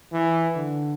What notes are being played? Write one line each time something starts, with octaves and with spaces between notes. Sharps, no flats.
E3
D3